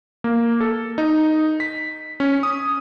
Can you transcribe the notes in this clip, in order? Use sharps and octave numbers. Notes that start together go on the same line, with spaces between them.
A#3
A4
D#4
B6
C#4
D#6